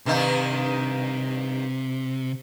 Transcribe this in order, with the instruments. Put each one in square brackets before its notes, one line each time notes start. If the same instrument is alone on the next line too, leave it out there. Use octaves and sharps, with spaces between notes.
[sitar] G2 D#3 D#4 [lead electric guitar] C3